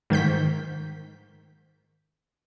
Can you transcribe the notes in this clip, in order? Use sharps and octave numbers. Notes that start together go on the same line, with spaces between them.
G#2 D#3 G6 B6